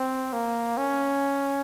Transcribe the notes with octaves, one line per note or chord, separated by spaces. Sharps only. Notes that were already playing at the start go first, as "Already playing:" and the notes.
Already playing: C4
A#3
C#4